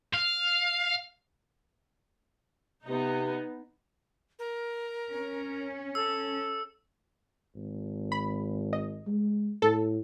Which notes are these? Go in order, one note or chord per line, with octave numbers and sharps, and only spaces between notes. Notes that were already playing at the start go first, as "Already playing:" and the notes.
F5
C3 B3 D#4
A#4
C#4
A4 E6
G#1
B5
D#5
G#3
A2 A4